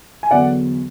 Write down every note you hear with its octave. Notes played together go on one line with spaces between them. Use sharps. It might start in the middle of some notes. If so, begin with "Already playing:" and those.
G#5
E2 D3 F#3 D5 F#5